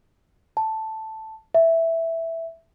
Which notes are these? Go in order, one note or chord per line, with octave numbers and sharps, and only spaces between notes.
A5
E5